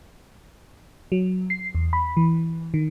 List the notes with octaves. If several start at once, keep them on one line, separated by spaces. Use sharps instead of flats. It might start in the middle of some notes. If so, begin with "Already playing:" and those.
F#3
C7
E2
B5
E3
D#3